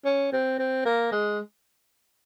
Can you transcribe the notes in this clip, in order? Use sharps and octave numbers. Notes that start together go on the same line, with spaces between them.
C#4
C4
C4
A#3
G#3